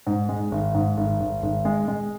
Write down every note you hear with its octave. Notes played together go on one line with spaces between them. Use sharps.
G#2
G#3
G#1
G#2
G#1
G#1
G#1
G#3
G#3